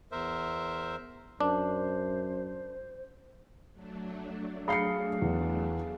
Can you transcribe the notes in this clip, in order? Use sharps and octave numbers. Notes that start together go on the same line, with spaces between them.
E2 A#4 C5 E5
F#2 D4 C5
F#3 A3 D4
G#4 F5 B5 C7 C#7
E2